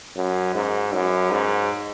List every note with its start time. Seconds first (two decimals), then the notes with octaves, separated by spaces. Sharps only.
0.16 F#2
0.55 G#2
0.93 F#2
1.31 G#2